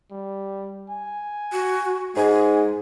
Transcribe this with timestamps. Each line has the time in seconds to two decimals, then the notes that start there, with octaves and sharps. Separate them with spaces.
0.11 G3
0.89 G#5
1.52 F#4
2.16 G#2 G#3 G#5